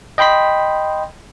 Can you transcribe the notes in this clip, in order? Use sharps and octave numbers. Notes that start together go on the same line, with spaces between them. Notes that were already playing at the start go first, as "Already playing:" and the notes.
D#5 G5 B5 C6 B6